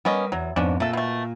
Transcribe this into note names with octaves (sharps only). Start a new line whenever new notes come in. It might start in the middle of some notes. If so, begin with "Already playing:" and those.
G3 B3 C#4 A#4 B4 D#5
E2 F#3
F2 G#2 B3 C#4 D4
A#2 A3 A4
B2 A3